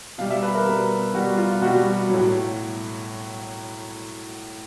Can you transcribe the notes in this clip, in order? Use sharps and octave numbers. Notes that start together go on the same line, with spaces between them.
B2 G3 F5
E5
B4
A#4
B2 G3
B2 G3 F#4
F4
B2 G3 F#4
A2 F#3